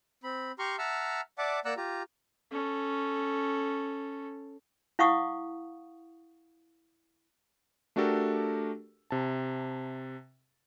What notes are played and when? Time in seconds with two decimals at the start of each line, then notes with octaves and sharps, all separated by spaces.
0.24 C4 B5
0.59 G4 A#5 C6 C#6 F6
0.78 E5 F#5 A5 A#5 E6 F6
1.38 D5 E5 F#5 A5 D6
1.65 A#3 D5 F#5 A#5 E6 F#6
1.77 F4 G4 A#5
2.52 C#4 A4
4.99 E4 F5 F#5 C#6 D#6
7.96 A3 D4 F#4 G4 A4 A#4
9.11 C3 A5